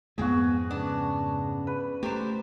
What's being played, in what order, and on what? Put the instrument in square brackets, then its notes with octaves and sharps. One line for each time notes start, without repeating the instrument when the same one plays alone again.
[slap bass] F2 G#2 G#3 [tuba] B3 [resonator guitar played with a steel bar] C4 [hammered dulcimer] F#4 G#4
[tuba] C#3 [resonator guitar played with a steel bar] B3 D4
[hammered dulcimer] B4
[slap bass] A3 [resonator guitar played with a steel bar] G4 A#4 C5